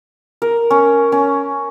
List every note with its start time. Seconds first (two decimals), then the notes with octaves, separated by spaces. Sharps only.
0.42 A#4
0.70 C#4
1.12 C#4